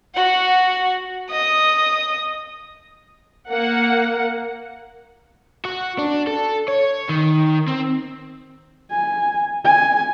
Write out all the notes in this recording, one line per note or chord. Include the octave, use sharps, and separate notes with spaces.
F#4 F#5
D#5 D#6
A#3 F#5
F#4
D4
A4
C#5
D#3
C4
G#5
G#5